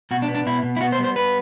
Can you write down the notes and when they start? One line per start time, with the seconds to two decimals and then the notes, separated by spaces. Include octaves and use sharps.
0.11 B2 F#4
0.22 D4
0.28 B3
0.35 D4
0.46 B2 E4
0.63 B2
0.77 E4
0.81 B3 F#4
0.92 C5
0.99 G3
1.04 C5
1.16 B3 B4